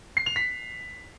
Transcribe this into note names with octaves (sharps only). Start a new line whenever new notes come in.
C7
F7
B6